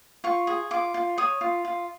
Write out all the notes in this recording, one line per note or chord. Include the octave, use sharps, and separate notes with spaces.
F4 C#6
G#4
F4 D6
F4
C#5 D#6
F4
F4